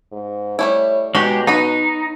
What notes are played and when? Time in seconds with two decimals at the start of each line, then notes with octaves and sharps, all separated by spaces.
0.12 G#2
0.59 G3 A3 E4 C#5
1.15 B2 G#3 D#4 F#4 G4 C#5
1.47 F#3 B3 D#4 B4